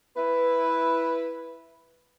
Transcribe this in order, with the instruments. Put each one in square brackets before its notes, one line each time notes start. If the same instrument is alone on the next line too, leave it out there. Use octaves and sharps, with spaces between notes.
[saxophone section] E4 B4